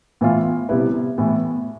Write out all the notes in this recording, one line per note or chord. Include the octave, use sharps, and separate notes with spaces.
A2 E3 B3 F4
C3 G3 B3 E4 B4
A2 E3 B3